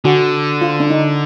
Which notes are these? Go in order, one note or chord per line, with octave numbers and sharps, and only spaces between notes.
D3 F#4
F4
D4
D#4